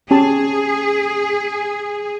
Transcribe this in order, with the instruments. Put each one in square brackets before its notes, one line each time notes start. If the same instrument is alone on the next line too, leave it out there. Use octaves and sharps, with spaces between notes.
[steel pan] C#4 G4 A5 [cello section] G#4